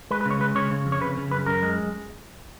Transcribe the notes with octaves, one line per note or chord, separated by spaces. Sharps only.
G#3 B4
B4
C#3
C#5
G#3 B4
C#3 C#5
C#3
F2
C#5
C#3 B4
C#3
F#2 B4
F#2 A#4
G#3